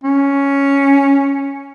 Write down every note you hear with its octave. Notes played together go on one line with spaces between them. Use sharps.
C#4